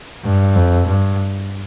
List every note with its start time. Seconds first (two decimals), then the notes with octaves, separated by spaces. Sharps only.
0.25 G2
0.55 F2
0.87 G2